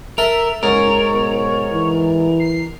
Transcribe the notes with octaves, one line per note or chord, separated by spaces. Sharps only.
A4 A#4 E5
F#1 G#2 A#4 C#5
B1
E3
C7